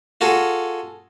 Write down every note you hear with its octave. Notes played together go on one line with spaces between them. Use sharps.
F4 F#4 G#4 A4